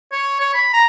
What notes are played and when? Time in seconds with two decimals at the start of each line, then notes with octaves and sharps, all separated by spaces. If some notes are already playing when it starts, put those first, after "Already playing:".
0.12 C#5
0.40 C#5
0.54 B5
0.73 A#5